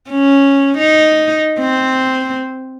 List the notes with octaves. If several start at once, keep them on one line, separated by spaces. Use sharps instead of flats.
C#4
D#4
C4